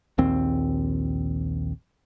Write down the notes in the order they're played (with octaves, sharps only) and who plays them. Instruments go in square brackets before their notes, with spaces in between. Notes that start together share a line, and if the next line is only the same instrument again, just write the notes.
[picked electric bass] A#1 D#2 C4